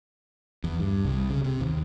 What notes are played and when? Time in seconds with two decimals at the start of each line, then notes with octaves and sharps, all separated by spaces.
0.64 E2
0.80 G2
1.05 C2
1.30 C#3
1.44 C3
1.61 D#2